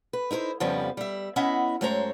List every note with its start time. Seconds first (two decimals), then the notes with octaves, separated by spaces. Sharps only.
0.13 B4
0.31 D#4 E4 A4 C5
0.60 F2 C#3 F3 G3 B3
0.97 G3 E5
1.36 B3 C#4 E4 D#5 E5 F#5
1.81 F#2 G#3 A3 C5 C#5 A#5